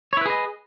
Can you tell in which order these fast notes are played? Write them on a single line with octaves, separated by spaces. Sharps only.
C#5 E4 B4 G#4 D#5